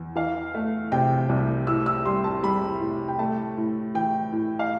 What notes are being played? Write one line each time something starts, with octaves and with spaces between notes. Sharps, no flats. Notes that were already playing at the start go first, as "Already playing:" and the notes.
Already playing: E2
E3 F5
A3
C3 G5
C2
A2 E6
E6
G3 C6
A5
G3 B5
A2
G5
A3 A5
A2
E3 G5
A2
F5